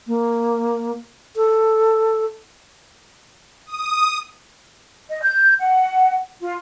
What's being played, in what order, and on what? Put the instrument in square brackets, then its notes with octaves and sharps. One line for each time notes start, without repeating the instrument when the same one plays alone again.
[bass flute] A#3
A4
[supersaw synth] D#6
[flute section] D#5
G6
F#5
F4